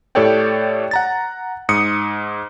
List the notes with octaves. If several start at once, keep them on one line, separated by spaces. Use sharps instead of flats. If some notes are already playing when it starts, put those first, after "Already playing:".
A2 G4 A4 C#5 D5 G5
F#5 A#5 A6
G#2 D#6 C#7